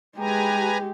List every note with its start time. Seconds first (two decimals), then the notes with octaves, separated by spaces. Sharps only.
0.18 G#3 G4 B4 G#5 A#5